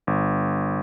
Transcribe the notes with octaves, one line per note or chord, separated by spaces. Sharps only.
G1